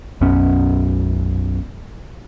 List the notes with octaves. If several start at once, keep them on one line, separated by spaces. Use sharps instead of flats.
B1 F#2 B3 C#4